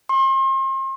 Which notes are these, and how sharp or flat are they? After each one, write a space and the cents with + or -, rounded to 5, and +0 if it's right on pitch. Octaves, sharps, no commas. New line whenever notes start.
C6 +40